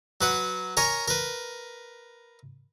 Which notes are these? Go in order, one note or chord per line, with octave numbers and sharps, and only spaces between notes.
F#3 B4 F#5
A#4 C#5 G#5 A#5
A#4 B4